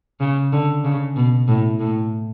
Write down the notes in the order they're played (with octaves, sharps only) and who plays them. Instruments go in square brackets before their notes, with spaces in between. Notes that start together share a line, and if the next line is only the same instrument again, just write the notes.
[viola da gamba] C#3
D3
C#3
B2
A2
A2